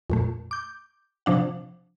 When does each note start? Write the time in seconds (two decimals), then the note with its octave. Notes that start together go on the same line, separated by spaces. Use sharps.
0.10 F2 A#2 A3
0.51 D6 G6
1.26 C3 F3 D4 F#5